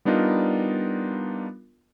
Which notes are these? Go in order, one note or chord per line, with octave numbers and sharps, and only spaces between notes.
G3 B3 D4 D#4 F4 A#4